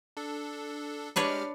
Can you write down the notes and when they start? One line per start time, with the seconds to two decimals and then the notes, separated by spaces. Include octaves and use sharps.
0.17 D4 A4
1.16 G#3 D4 G4 B4 C#5 F6